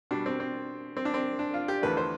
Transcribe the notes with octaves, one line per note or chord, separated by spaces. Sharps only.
B2 G3 D4
C4
C4
C4
D4
C4
D4
F4
G4
E2 D3 F3 A3 B4
C5